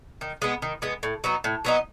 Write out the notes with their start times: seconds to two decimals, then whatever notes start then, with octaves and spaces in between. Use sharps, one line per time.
0.21 D#3
0.42 G#3 B3
0.62 D#3
0.82 G#3 B3
1.03 A2
1.24 F#3 B3 D#4
1.44 A2
1.65 F#3 B3 D#4